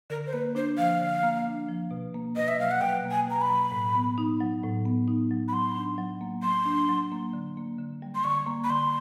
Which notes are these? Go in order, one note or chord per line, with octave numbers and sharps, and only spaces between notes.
D3 A#4
C5
A#3 B4
D4 C5
F3 F5
D3
A#3
D4
F3
B2
A#3
B2 D#5
E5
F#3 F5
F#5
B2 G5
A#3
G#5
B2 A#5
B5
F#3
A2
B3
D#4
F#3
A2
B3
D#4
F#3
B5
F#3 C6
D4
F#3
A#3
F#3 C6
D4
F#3
A#3
D3
A#3
D3
G3
C6
D3 C#6
A#3
B5
D3 C6